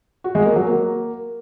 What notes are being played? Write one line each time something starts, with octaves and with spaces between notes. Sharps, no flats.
F#4
G#3
A#3
F#3
A#3